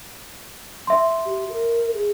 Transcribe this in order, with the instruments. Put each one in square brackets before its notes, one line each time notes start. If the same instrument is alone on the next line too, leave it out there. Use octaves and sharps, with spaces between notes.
[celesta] E5 C6
[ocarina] G4
A#4
G#4